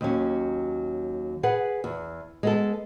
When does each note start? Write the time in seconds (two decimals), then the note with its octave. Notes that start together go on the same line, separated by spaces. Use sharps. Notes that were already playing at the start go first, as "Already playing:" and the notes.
0.01 D#2 F#3 C#4
1.43 G#4 B4 F#5
1.84 E2
2.43 G#3 B3 A4